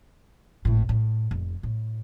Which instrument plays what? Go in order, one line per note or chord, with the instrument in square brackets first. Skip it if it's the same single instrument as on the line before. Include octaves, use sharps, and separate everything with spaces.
[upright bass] G#1 A2
A2
F1
A2